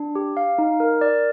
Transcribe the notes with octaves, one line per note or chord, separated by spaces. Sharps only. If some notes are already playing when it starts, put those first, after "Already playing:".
Already playing: D4
G4
F5
D#4
A#4
D5